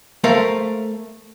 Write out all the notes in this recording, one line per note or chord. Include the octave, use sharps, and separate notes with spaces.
A3 A#4 C5 F5